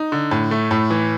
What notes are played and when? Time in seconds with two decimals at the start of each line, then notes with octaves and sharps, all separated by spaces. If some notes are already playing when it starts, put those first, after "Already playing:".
Already playing: D#4
0.12 D3
0.31 A2
0.51 A3
0.71 A2
0.90 E3